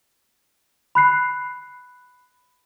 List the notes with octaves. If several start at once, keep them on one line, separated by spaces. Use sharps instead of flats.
B5 F#6 C7